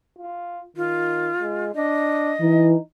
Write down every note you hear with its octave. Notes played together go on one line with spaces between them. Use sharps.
F4
D#3 F4
G#3
D4 D#5
E3 D#4